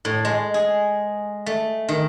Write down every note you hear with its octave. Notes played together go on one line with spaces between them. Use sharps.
A2
G#3
G#4
A3
D#3